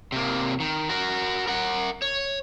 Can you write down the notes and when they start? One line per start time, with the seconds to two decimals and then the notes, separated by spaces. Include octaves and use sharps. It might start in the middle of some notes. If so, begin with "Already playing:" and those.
0.12 C3 A#3
0.60 D#3
0.89 F#4 A#4
1.48 A#4 F#5
2.02 C#5